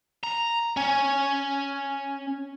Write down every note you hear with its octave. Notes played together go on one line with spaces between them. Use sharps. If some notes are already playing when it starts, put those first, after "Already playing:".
A#5
C#4